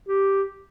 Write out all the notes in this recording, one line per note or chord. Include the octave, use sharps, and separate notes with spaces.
G4